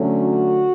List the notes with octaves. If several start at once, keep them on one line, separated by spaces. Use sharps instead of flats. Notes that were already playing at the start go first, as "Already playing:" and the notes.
Already playing: D3 F#3 A3 C#4
F#4